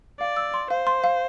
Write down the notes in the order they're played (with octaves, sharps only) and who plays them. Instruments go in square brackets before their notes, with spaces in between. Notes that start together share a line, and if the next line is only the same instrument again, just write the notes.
[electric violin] D5 [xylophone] F5
[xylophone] E6
C6
[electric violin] C5 [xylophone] F5
[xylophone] C6
F5